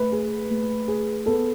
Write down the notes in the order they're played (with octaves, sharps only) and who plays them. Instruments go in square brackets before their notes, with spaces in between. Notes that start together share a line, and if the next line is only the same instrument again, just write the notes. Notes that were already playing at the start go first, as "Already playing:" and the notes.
Already playing: [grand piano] A3 [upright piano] B4
[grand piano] G#4
A3
G#4
[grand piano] B3 [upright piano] A4